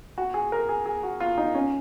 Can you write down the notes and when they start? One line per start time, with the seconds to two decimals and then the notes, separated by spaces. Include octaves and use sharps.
0.18 F#4
0.34 G#4
0.52 A#4
0.69 G#4
0.86 G#4
1.03 F#4
1.20 F4
1.38 D#4
1.54 C#4